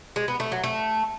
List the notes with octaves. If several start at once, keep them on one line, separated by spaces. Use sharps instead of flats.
G#3
B3
A3
F#3
A3